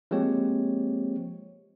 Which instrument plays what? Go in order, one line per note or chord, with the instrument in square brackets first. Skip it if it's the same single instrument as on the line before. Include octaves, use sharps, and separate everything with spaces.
[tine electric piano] F3 G#3 A#3 C4 G4 C#5